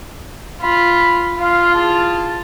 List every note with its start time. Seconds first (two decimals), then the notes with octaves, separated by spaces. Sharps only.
0.61 F4 B5
1.39 F4 F5
1.73 E4 G#4 A5